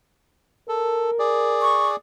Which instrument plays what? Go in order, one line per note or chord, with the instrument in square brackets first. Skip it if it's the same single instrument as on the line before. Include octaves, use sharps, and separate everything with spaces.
[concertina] A4 [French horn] A#4
[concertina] G#4 D5
[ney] C#6